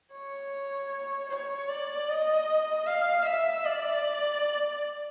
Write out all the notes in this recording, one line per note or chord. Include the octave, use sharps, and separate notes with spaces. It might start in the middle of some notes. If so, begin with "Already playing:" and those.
C#5
C#5
D5
D#5
F5
E5
D5